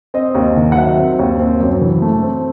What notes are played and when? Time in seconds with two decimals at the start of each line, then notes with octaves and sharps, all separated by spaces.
0.14 C4 D#5
0.35 D#2
0.56 D#3
0.72 F#5
0.76 F#3 E5
0.98 C4
1.19 D#2
1.39 C4
1.61 F#2
1.81 E3
2.02 A3
2.23 C4